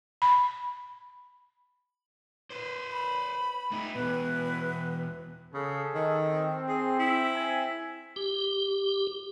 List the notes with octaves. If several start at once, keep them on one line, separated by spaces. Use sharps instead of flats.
B5
B4 C5
B5
A3 D#4
E2 B2 B4
C#3 G#4 A4
D#3
C4
G#4
E4
C4 G#5
G4